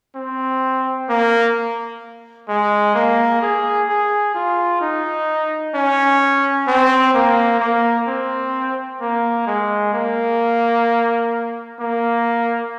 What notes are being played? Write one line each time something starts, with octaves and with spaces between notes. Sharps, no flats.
C4
A#3
G#3
A#3
G#4
G#4
F4
D#4
C#4
C4
A#3
A#3
C4
A#3
G#3
A#3
A#3